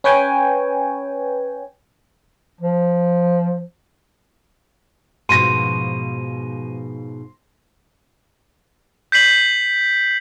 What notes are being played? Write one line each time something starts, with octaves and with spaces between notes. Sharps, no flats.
C#4 B4 C#5 G5 G#5
F3
G#2 B2 F3 C6 A#6 D#7
G6 B6 C7 F#7